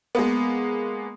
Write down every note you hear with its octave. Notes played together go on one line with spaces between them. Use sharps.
G#3 A#3 B3